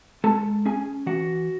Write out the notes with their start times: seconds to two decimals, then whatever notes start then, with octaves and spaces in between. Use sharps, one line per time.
0.24 G#3 A4 A5
0.65 C#4 G#4 G#5
1.06 E3 F#4 F#5